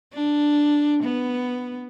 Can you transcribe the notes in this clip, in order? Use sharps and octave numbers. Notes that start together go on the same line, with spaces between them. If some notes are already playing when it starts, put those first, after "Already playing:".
D4
B3